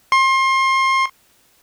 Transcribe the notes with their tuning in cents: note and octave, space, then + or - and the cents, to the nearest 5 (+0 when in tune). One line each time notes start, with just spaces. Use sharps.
C6 +30